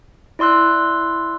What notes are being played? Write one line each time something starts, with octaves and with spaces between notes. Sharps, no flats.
E4 D5 C6 E6 F#6